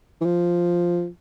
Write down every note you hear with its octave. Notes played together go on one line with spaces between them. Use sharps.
E3
F3